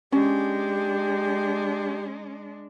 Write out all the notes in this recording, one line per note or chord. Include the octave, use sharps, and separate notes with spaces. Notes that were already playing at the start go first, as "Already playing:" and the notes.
G#3 C#4 D4 G4